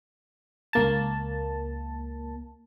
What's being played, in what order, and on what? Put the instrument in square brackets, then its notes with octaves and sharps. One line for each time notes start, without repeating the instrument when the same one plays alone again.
[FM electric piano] C#2 A#3 A5